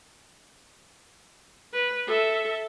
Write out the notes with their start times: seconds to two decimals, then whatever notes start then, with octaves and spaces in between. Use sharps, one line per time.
1.73 B4
2.07 A4 E5